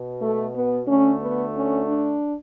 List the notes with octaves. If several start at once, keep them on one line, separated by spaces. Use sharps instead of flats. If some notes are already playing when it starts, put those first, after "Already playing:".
Already playing: B2
A3
B3
D2 D3 A3 C#4
B3
C#4
D4